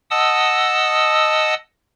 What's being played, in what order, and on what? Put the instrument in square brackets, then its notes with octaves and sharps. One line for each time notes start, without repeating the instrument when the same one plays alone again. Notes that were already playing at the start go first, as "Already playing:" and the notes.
[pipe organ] D#5 F#5 A5 D#6 E6